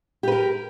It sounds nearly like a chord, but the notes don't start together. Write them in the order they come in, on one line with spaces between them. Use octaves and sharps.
G4 B4 A#4